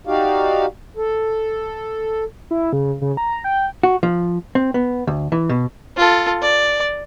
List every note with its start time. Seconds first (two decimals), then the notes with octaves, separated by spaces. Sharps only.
0.07 D#4 F#4 G4 D5 F5
0.97 A4
2.51 E4
2.73 C#3
3.02 C#3
3.17 A#5
3.44 G5
3.83 F#4
4.03 F3
4.55 C4
4.74 B3
5.07 D2
5.32 E3
5.49 B2
5.97 F4 A4
6.42 D5